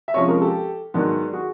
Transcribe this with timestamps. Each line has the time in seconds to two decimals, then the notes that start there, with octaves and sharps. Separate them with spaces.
0.08 E5
0.14 C3 F3 G#3 C#4 C#5 D#5
0.28 G#4 A#4
0.41 G4 A4
0.94 G#2 D#3 F#3 B3 D4
1.33 F#4 G#4